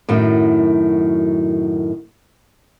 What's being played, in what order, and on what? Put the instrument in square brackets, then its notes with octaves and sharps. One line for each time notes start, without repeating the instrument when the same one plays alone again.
[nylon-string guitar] F#2 A2 D#3 F#3